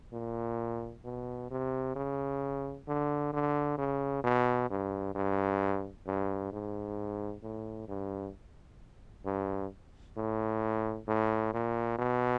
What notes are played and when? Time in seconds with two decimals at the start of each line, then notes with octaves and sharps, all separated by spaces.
0.13 A#2
1.05 B2
1.50 C3
1.96 C#3
2.87 D3
3.33 D3
3.78 C#3
4.24 B2
4.70 G2
5.15 G2
6.07 G2
6.52 G#2
7.42 A2
7.88 G2
9.25 G2
10.17 A2
11.08 A2
11.53 A#2
11.99 B2